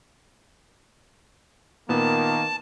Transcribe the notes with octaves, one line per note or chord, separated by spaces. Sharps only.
A#2 D#3 A#3 B3 A5